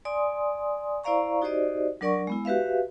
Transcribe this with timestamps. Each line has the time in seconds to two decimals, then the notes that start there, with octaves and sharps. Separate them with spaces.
0.05 D5 G#5 C6 D#6
1.04 E4 C5 D5 F5 A#5 C#6
1.42 D#4 F#4 G4 C5 D5 D#5
2.01 F#3 D4 A#4 D5 F#5 C#6
2.27 G#3 B3 E4
2.45 F#4 G4 B4 E5 F5